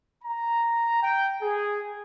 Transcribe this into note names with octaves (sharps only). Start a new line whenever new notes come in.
A#5
G5
G#4